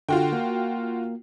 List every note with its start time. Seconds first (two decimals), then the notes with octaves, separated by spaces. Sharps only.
0.09 D3 F4 F#4 G5
0.33 A#3